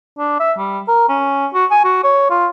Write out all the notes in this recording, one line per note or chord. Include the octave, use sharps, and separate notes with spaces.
D4
E5
G3
A#4
C#4
F#4
G#5
F#4
C#5
F4